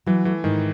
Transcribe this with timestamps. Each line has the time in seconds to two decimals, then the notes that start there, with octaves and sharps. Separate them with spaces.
0.06 E3 F#3
0.25 E3 A3
0.44 G#2 D#3